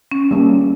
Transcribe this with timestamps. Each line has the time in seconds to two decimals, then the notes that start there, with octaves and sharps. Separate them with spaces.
0.11 C#4
0.31 G3 A#3 C#4